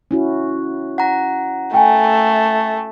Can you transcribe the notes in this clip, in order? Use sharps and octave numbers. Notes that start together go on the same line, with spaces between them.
C#4 E4 F#4
F#5 A#5
A3 A4 G5 G#5